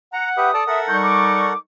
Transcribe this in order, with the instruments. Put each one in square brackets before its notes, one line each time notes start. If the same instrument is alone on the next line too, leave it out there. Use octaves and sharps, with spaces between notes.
[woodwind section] F#5 [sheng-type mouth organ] A#5
[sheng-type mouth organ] G4 B4 E5 [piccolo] D#6
[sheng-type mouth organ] A4 D5 A5
[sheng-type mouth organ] A4 A#4 F#5 [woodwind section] E5
[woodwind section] G3 D#4 C#6 [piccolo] G6
[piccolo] D6